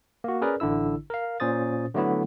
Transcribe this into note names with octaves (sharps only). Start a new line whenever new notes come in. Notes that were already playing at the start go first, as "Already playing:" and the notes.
A#3 F#4
C#4 G#4 A#4 B4 D5
A1 D3 D4 E4 E6
A#4 F5
A#2 C#4 C5 D#6 A6
D3 F#3 A3 B3 E4